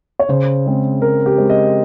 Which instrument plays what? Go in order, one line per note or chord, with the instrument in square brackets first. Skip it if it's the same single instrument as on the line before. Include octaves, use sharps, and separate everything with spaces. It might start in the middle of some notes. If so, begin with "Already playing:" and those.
[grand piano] C#5
C#3 C5
G#3 C4
C#3 A#4
G4
G#3 C4
D#5